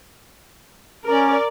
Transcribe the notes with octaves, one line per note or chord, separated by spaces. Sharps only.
C#4 A#4 D5